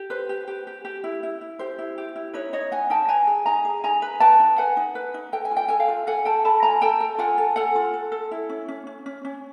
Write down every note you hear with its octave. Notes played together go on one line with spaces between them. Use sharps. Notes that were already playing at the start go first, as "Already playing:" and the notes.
Already playing: G4
B4 C5
G4
G4
G4
G4
E4
E4
E4
G4 C5
E4
G4
E4
D#4 B4 C#5
D#4 C#5 D#5
D#4 F#5 G#5
D#4 G5 A5
B4 G#5 A#5
G#4
D#4 G#5 A#5
G#4
D#4 G#5 A#5
B4
B4 G5 A5
D#4
B4 F#5 G#5
D#4
B4
D#4
A4 G5
G#5
F4
G5
A4 G#5
F5 G5
F4
A4 F#5 G#5
A4 G5 A5
A4 A5 B5
F4 G#5 A#5
A4 G5 A5
A4
F4 F#5 G#5
A4
A4 F#5 G#5
F4
A4
A4
E4
C#4
C#4
C#4
C#4
C#4